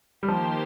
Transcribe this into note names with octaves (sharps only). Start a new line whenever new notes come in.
G3
D#3 F3 A#3 D#4 G4 C5